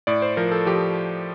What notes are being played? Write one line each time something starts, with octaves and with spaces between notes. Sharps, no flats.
A2 D5
C5
F3 A#4
A4
F3 G4